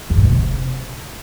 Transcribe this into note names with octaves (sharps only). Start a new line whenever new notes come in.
E2
A2
B2
C3